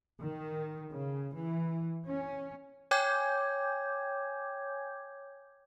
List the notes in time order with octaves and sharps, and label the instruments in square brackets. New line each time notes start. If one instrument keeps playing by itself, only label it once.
[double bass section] D#3
C#3
E3
C#4
[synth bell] C#5 G5 G#5 D6 G6 G#6